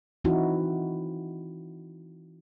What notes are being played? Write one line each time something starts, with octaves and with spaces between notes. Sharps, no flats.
E3 C4 D#4 E4 F#4